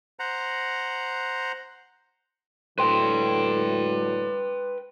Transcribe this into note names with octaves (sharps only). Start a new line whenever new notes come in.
C5 F#5 A#5
A2 D3 F#3 B4 G5 C6